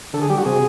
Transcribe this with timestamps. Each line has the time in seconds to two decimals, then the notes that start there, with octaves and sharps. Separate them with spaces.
0.13 D3 A4
0.22 G#4
0.30 G3 G4
0.38 F#4
0.45 C3 G#4